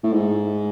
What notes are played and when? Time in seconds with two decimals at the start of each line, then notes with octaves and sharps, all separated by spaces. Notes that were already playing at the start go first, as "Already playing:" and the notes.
0.03 A2
0.13 G#2